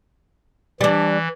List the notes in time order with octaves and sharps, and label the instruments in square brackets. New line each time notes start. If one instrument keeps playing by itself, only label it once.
[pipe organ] E3 [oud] G3 D4